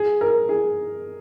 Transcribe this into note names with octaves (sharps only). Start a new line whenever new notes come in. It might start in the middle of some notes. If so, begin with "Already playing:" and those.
Already playing: G#4
A#4
G#4